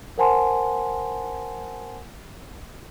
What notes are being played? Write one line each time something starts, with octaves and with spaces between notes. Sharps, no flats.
A#4 C5 F#5 G#5 A5 C6